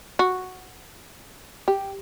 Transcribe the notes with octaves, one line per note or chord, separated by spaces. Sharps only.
F#4
G4